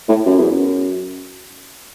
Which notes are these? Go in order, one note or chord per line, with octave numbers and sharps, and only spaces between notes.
A2
F#2
E2
F#2